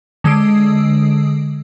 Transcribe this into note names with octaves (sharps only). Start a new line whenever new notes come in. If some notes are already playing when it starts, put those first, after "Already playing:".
D3 G#3 D#6 E6 C7 D7